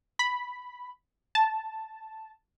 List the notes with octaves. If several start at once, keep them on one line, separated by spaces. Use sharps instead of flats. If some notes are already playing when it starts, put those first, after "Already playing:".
B5
A5